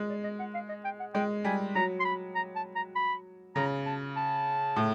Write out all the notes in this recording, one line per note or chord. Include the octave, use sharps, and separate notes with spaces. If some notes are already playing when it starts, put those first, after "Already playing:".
Already playing: G#3
D5
D#5
F#5
F5
D#5
G5
F#5
G#3 G5
G3 G#5
F#3 A#5
C6
B5
A#5
A5
A#5
B5
C#3 A#5
A5
A5
A2